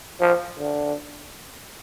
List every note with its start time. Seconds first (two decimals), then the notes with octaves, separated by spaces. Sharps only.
0.20 F3
0.59 D3